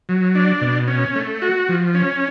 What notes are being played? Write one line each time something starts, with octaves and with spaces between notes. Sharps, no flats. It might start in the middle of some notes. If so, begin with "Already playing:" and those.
F#3
D4
B2
C#4
A3
F#4
F3
C#4